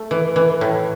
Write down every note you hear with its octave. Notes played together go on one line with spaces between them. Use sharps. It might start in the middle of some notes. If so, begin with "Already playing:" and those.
Already playing: A3
E3
E3
A2